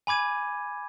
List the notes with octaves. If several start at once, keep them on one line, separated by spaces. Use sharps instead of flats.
G#5 B5 D6 G#6 D#7